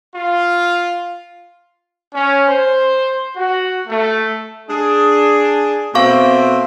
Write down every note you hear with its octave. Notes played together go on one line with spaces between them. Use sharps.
F4
C#4
C5
F#4
A3
D4 G#4
B2 A3 C4 F5 C#6 D6